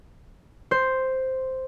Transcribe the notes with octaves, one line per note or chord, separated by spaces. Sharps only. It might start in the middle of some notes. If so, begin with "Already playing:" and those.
C5